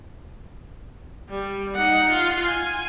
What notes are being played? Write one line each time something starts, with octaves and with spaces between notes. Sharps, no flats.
G3
D#4 F#5
F4
G#5